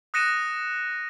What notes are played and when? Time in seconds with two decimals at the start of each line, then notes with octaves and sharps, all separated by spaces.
0.14 D#6 F#6 A#6 C#7 D#7 E7